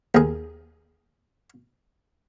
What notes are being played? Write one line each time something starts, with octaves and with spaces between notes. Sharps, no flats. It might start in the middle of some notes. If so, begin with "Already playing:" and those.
D#2 G#4